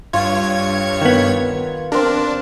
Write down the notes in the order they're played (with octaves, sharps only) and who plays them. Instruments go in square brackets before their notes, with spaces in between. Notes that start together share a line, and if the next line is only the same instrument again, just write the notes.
[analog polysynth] G2 C#5 G#6 [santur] F4
[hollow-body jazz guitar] D#3 B3
[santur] C4 A#4 [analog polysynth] D4